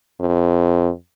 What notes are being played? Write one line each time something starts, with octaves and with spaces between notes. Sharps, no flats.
F2